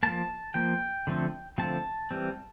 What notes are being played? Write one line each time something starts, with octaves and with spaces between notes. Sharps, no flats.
F3 A#3 A5
F3 A#3 G5
D3 F3 A3 C4
D3 F3 A3 C4 A5
E3 G3 C4